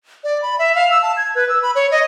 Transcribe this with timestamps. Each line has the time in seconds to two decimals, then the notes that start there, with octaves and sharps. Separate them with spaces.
0.24 D5
0.42 B5
0.59 E5
0.75 F5
0.91 E6
1.02 A5
1.17 G#6
1.35 B4
1.49 E6
1.62 B5
1.75 C#5
1.91 D#5